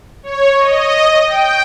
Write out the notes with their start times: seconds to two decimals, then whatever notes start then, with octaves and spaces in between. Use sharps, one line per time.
0.23 C#5
0.57 D#5
1.26 G5